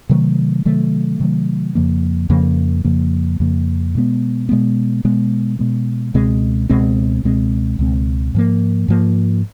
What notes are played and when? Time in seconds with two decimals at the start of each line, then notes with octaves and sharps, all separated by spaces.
0.09 C3 D#3 F#3 A3
0.65 C3 D#3 F#3 A3
1.20 C3 D#3 F#3 A3
1.75 F2 C#3 F3 A#3
2.30 F2 C#3 F3 A#3
2.84 F2 C#3 F3 A#3
3.40 F2 C#3 F3 A#3
3.95 B2 G#3 B3
4.49 B2 G#3 B3
5.04 B2 G#3 B3
5.59 B2 G#3 B3
6.14 C#2 B2 G#3 C4
6.69 C#2 B2 G#3 C4
7.24 C#2 B2 G#3 C4
7.79 C#2 B2 G#3 C4
8.35 G#2 F3 A#3
8.88 G#2 F3 A#3